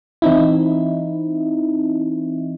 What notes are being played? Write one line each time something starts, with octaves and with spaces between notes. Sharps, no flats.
E3 C4 D#4 E4